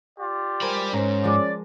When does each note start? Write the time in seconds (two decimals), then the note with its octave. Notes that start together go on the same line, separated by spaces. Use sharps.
0.19 F4 G4 D5
0.62 G3 A#4 C5 G#5 B5
0.93 G#2 C#4 C5 A#5
1.24 F3 G#3 D5